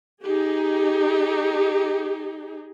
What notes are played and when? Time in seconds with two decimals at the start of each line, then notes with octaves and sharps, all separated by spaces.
0.22 D#4 G4 G#4